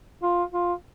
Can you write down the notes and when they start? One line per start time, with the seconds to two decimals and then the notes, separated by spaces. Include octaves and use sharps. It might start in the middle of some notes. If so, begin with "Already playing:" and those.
0.22 F4
0.52 F4